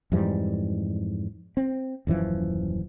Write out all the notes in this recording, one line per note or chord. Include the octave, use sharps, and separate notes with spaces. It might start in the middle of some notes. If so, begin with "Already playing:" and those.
F2 G#2 E3 G3
C4
D#1 F#2 E3 F3